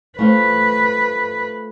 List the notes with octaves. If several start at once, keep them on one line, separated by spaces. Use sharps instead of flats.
A3 F4 B4 C5